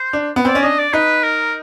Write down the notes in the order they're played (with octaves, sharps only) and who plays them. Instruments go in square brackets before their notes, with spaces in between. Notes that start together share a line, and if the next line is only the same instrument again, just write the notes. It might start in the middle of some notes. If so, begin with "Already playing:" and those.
Already playing: [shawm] C5
[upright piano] D4
B3
[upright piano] C4 [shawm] D5
[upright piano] C#4
[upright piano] D4 [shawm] D#5
[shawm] D5
[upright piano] D#4 [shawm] B4
[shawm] A#4